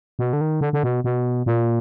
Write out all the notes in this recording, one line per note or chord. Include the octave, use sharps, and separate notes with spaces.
B2
D3
D#3
D3
D3
B2
B2
A#2